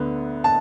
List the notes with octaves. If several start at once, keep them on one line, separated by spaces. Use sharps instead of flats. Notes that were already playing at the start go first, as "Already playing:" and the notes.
Already playing: D2 D3 B3
A5